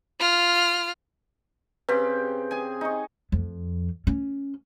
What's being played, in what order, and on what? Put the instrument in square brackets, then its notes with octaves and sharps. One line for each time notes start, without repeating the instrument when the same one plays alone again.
[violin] F4 F6
[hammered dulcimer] C#3 C4 G4 [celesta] B4
[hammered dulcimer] G#4 G#5
D#4 C#6
[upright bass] F2
C#4